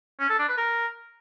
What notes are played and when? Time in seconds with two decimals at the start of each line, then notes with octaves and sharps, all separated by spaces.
0.20 C#4
0.29 A4
0.39 D4
0.48 B4
0.58 A#4